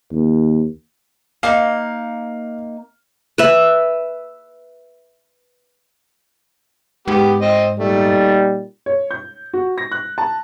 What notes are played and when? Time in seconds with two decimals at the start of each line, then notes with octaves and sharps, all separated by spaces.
0.11 D#2
1.43 A#3 D#4 F5
3.38 B4 E5
7.08 G#2 B3 G4
7.41 C4 D#5
7.80 A#2 G3 A3 D#4
8.86 C#5
9.11 G6
9.53 F#4
9.78 A#6
9.92 F#6
10.18 A5